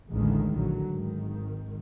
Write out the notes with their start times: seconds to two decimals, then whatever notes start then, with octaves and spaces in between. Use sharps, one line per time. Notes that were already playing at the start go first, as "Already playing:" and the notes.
0.11 A1 D#2 A2 D3 D#3 G#3
0.55 A#1 D3 F#3
0.89 G#1 D#3